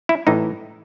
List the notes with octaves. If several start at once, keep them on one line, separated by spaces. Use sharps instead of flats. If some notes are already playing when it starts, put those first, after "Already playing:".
E4
A2 E3 D#4